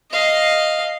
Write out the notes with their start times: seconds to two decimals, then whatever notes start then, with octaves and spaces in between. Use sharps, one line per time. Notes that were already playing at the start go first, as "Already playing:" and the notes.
0.11 D#5 F5